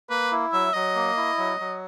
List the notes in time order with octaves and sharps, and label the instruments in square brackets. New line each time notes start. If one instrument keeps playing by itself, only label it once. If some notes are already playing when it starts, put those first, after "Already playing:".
[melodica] A#3 [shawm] B4
[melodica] E4
[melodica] F#3 [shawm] E5
[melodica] F#3 [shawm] D#5
[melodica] A#3
E4
F#3
F#3